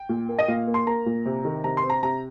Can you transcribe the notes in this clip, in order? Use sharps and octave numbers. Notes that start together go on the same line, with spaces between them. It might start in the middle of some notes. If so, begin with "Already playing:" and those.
Already playing: G5
A#2
A#3
D#5
A#2 F5
A#3
C6
A#3 A#5
A#2
C3
D#3
C3 A#5
C6
C4
A#5
C3 A#5